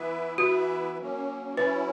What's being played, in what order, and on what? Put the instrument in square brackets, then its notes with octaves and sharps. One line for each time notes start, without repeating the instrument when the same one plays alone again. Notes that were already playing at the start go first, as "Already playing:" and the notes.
Already playing: [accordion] E3 B3 E4 B4 E5
[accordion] E3 B3 E4 B4 E5 [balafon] F#4
[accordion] F#3 A#3 C#4
[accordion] F#3 C#4 E4 [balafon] B4